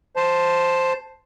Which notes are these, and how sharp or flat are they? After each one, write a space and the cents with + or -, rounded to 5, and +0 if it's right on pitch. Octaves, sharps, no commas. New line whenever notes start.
C5 +0 A5 +0